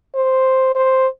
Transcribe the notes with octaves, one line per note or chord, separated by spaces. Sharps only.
C5
C5